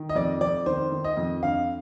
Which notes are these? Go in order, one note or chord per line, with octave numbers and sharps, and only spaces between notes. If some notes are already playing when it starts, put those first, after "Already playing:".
Already playing: D#3
D#5
F2 D5
F2 D5
D#3 C5
D#3
D#5
F2
D3 F5